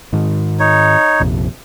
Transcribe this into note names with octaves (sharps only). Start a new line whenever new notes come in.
G#2 D#3
D#4 C#5
A#1 F2 C3